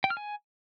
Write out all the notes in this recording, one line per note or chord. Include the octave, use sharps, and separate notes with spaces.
G5
F6
G#5